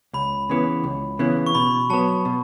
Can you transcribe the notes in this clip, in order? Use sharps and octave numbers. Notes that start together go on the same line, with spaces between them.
C#2 B5
C#3 E3 B3
C#2
C#3 E3 B3
C#6
B2 B5
F#3 B3 A5
B2